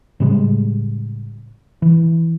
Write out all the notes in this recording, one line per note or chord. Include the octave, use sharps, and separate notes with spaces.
A2 C#3 G3 G#3
E3